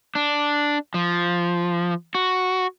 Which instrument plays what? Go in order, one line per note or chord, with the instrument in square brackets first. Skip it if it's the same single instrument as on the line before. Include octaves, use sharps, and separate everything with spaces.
[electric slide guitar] D4
F3
F#4